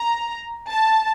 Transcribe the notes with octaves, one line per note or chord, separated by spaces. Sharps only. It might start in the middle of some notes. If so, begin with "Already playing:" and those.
Already playing: A#5
A5